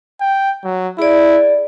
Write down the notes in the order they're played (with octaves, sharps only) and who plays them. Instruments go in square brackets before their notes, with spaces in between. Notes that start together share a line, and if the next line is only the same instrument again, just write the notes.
[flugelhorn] G5
F#3
[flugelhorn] E4 [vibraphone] G#4 D5